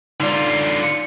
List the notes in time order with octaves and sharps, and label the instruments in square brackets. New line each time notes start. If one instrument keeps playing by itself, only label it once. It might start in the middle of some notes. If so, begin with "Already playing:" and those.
[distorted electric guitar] D3 F4 [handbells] D#4 D5